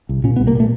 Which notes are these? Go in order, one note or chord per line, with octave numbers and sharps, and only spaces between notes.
C2
A#2 C#4
B3
C2
A#3
A#2 A3